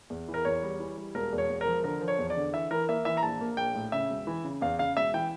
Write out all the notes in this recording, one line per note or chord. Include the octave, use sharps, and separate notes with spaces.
E2
E3
A#4
E2 C#5
G3
E3
G3
E1 A#4
E2
C#5
E1
A#4
F3
D3 A#4
F3
C#5
E2
D5
D3
E3 E5
E3 A#4
A#3 E5
E3 E5
A#5
A#1 A5
A#3
A#1 G5
A2
C#3 E5
E1
E3
C#3
E2 F5
C#3 F5
E1 E5
E3 G5